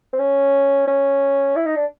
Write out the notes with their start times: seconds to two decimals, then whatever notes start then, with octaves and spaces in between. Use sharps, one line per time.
0.13 C4
0.19 C#4
0.87 C#4
1.56 E4
1.66 D#4
1.76 D4